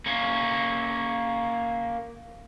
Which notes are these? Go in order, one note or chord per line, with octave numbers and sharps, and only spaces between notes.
A#3 C#4